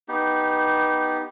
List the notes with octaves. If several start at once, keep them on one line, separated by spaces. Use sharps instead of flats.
B3 D#4 G4